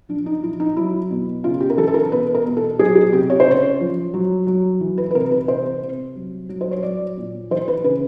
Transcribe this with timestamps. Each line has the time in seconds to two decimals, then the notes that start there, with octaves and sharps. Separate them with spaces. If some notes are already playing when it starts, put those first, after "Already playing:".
0.09 F3 D4
0.26 D#4
0.43 F3 E4
0.60 D#4
0.77 F#3 E4
1.11 B2
1.44 C#3 F4
1.60 G4
1.70 A#4
1.77 E3 A4
1.88 A4
1.94 A#4
2.12 B2 B4
2.35 A#4
2.46 B2
2.57 A4
2.79 F#3 G#4
2.95 G#4
3.13 C3 G4
3.30 C#5
3.40 C5
3.46 C#3
3.51 C#5
3.80 F3
4.14 F#3
4.47 F#3
4.80 E3
4.98 B4
5.11 B4
5.15 C3 A#4
5.31 B4
5.48 C3 C5
5.82 C3
6.16 F#3
6.49 F#3
6.61 C5
6.71 C#5
6.83 F#3 D5
7.17 A#2
7.51 E3 C5
7.68 B4
7.84 C#3 B4